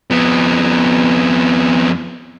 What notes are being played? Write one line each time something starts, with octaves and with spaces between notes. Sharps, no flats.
F2 B3